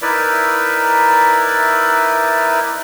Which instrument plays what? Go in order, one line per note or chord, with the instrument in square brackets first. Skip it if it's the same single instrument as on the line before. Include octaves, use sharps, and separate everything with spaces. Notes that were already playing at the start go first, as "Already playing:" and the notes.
[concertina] D#4 E4 A#4 B4 D5 E5